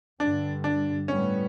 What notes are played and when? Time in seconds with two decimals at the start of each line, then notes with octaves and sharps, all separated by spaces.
0.20 G2 D3 G3 D4
0.64 D4
1.08 A2 G3 B3 C#4